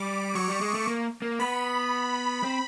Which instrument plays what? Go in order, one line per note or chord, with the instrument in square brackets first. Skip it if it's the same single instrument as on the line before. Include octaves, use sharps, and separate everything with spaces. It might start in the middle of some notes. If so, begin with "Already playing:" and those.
Already playing: [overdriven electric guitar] G3 [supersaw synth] D6
[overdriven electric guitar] F#3 [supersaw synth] C#6
[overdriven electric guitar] G3
G#3
A3
A#3
A#3
[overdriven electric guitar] B3 [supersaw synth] B5
[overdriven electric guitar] C4